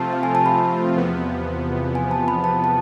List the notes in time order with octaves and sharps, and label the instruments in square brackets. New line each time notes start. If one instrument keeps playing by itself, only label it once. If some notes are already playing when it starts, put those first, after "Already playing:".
Already playing: [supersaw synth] C3 F3 A3 C4 F4 [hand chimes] A5
[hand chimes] F5
G#5
A5
B5
[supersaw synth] E2 C3 F3 B3
[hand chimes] G#5
A5
B5
A5
A5